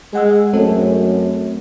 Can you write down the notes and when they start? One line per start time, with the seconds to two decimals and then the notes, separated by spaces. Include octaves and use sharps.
0.13 G#3 G#4 F#5 E6
0.53 F#2 A3 C4 A4